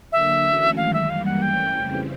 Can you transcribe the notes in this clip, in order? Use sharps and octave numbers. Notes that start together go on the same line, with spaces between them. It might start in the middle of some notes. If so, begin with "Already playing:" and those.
D3 F#3 A#3 D4 E5
E3 A3 C#4 F#4
F#2 D#3 G#3 F5
E5
G2 E3 G3 A#3 F5
F#5
E3 A3 C#4 G5
F2 C#3 E3 G3 C4